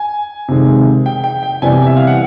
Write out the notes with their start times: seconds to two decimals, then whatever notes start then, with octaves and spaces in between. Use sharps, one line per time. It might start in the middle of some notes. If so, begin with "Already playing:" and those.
Already playing: G#5
0.48 C3 D#3 G#3
1.06 G5
1.24 G5
1.43 G5
1.62 C3 E3 G3 B3 G#5
1.87 E5
1.97 F5
2.07 F#5